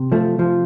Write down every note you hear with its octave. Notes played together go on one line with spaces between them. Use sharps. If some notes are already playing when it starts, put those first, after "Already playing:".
Already playing: C3
F3 A3
F3